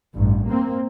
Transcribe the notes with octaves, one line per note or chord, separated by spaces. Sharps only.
A1 G2
A#3 C4